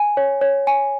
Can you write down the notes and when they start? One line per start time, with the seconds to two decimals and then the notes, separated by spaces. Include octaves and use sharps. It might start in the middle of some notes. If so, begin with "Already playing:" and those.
Already playing: G#5
0.17 C#5
0.41 C#5
0.67 G#5